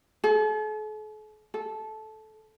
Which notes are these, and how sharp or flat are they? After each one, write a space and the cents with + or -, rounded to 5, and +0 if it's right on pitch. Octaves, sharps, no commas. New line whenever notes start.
A4 -45
A4 -15